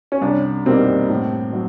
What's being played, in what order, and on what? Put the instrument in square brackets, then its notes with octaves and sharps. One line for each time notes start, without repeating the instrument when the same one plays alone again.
[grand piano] C#4
[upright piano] C2 [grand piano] D4
[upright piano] B2 G3 A#3 D#4 [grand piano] C4
[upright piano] A2
F#3